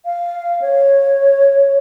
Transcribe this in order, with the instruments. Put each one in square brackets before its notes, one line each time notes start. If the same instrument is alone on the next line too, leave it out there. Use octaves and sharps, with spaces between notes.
[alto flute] F5
C#5